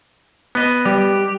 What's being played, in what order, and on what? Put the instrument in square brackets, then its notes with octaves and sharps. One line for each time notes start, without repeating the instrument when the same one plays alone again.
[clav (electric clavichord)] B3 D#5
[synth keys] G3 [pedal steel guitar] G4